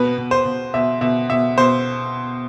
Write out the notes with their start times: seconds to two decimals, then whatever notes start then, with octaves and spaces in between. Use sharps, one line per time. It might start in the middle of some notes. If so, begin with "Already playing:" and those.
Already playing: B2 B4
0.18 B2
0.31 C5
0.45 B2
0.74 B2 E5
1.01 B2 E5
1.30 B2 E5
1.58 B2 C5